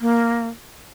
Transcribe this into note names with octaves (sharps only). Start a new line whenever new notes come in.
A#3